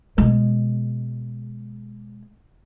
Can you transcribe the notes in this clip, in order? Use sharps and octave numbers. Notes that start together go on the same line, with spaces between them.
B2 G#3